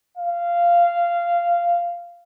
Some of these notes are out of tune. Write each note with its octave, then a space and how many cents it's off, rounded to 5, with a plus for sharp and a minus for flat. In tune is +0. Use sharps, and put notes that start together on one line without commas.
F5 -15